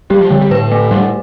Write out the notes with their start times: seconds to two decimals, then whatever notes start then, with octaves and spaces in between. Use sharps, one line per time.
0.10 G3 G4
0.21 F3
0.30 D3 G3
0.41 G3
0.51 A2 B4
0.72 A3
0.91 G2 G3
0.97 A2